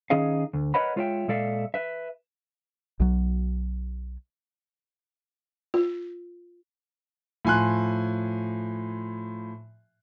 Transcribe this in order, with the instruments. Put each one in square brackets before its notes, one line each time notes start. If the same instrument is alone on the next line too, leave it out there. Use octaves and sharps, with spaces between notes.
[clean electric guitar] D#3 C#4 D#4 G#4 D#5 F5
D2
A#4 B4 C#5 D#5 F#5 B5
G#3 F4 C#5 D#5 E5 G5
A#2 G#3 A4 D5 E5 F5
B4 E5
[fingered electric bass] B1 F#3
[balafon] F4
[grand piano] A2 F3 G#5 C6 F#6